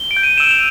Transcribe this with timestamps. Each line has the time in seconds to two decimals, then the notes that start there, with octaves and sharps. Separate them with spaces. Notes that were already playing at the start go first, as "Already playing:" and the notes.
Already playing: G7
0.11 D7
0.16 G6
0.23 D#7
0.38 E6 E7
0.51 F7